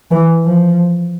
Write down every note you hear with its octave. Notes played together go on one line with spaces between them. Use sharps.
E3
F3